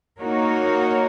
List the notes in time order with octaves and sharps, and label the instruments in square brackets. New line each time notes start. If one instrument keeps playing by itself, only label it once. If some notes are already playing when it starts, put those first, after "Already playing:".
[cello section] A#3 D#4 F#4 A#4 C#5